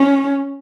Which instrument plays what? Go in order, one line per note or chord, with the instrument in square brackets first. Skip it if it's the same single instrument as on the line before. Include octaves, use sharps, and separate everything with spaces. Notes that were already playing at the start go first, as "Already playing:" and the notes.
Already playing: [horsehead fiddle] C#4